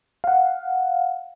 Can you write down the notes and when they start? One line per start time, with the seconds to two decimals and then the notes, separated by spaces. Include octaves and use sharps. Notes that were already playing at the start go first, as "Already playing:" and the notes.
0.24 F5 F#5